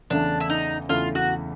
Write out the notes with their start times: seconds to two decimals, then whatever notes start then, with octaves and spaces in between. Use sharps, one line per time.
0.10 E2 C#3 E3 A3 D4
0.40 E4
0.50 D#4
0.89 E2 C#3 E3 A3 F4
1.15 F#4